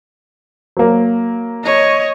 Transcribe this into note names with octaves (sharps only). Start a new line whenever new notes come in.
F#3 A#3
C#5 D#5